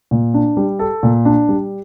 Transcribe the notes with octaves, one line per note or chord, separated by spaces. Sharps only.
A#2
D4
G3
A4
A#2
D4
G3